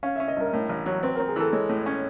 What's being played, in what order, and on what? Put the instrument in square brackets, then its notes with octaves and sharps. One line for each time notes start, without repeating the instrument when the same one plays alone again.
[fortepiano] C#4 [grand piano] F5
[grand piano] E5
[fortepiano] C#4
[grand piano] D#5
[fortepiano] G2 [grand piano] A#4
[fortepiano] A2 [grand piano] A#4
[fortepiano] A1
F#3
[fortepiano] C4 [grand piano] B4
[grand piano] A#4
[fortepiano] C4
[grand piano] G#4
[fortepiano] E3 [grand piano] A4
[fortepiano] G#3 [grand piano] C#5
[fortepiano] A2
C#4